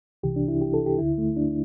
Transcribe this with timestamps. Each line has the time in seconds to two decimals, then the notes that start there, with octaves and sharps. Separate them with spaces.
0.23 C2 C3 E3 G4
0.36 D4
0.48 E4
0.61 G4
0.74 A4
0.86 G4
0.98 D2 D3 E4
1.18 A3
1.36 D4